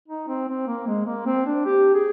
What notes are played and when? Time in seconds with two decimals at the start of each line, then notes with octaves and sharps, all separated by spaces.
0.08 D#4
0.28 C4
0.48 C4
0.67 A#3
0.87 G#3
1.06 A#3
1.26 C4
1.46 D4
1.66 G4
1.94 G#4